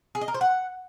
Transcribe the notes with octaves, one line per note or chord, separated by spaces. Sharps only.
G#4
D#5
A#4
C5
F#5